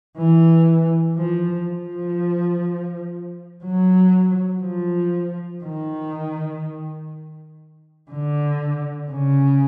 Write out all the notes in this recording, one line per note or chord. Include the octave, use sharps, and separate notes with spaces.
E3
F3
F3
F#3
F3
D#3
D3
C#3